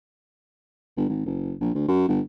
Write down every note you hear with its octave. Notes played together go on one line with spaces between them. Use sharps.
G1
G#1
F#1
A#1
D2
F#2
G1